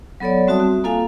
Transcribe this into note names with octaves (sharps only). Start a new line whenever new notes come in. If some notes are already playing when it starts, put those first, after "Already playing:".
F#3 B3 A4 C#5 D5
G3 C4 F#4 E5 A5 D#6
F#4
A#3 F4 A4 F5 G#5